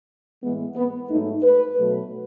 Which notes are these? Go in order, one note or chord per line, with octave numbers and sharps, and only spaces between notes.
A2 E3 G#3 B3
B3
G#2 F#3 A3 D#4
B4
B2 F#3 A3